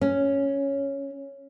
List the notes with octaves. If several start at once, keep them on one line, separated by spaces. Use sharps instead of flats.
C#4